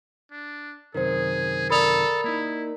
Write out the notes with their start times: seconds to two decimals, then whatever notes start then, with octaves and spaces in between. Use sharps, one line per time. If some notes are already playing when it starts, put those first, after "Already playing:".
0.32 D4
0.94 F#2 C3 D#3 G#4 A#4 C5
1.70 A4 A#4 D5 A#5 B5 D#6 F7
2.24 A#3 D#4 E4